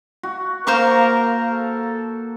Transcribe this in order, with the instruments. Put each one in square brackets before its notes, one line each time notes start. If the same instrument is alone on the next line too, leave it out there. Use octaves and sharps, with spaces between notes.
[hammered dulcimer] F#4
[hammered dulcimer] A#3 [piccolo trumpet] A#4 [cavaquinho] C5 F5 C#6
[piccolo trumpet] A4